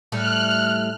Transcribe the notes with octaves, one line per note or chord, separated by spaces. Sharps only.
A2 G3 A3 F6 F#6